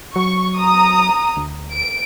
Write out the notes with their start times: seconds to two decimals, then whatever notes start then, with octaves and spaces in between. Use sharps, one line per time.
0.16 F#3 C#6
0.58 A#5 D#6
1.37 D2
1.72 D7